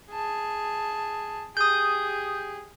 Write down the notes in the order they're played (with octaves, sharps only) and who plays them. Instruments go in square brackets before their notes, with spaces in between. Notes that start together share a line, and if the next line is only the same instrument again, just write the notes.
[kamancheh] G#4 A5
[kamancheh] G4 G#4 [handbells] D#6 G6